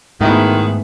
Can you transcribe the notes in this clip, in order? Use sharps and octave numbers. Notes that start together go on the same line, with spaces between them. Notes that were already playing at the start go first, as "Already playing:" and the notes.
G#2 D#3 G#3 A3 B3 E4 F#4